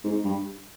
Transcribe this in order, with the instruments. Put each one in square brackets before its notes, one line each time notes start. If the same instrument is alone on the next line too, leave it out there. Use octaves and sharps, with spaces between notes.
[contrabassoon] G#2
G2